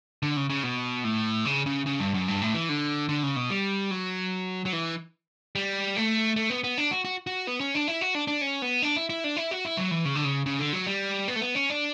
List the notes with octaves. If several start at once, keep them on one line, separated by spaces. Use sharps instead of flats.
D3
C#3
C#3
B2
A2
C#3
C#3
C#3
G2
F#2
G2
A2
E3
D3
D3
C#3
B2
G3
F#3
F#3
E3
G3
A3
A3
B3
B3
D4
F#4
F#4
F#4
B3
C#4
D4
E4
F#4
D4
D4
C#4
B3
D4
E4
E4
D4
E4
F#4
E4
F#3
E3
C#3
D3
C#3
C#3
D3
F#3
G3
B3
A3
B3
C#4
D4